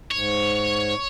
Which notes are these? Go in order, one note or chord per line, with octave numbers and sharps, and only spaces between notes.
G#2 C#5